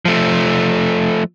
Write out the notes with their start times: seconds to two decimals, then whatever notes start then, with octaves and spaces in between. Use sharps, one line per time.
0.05 F3 A3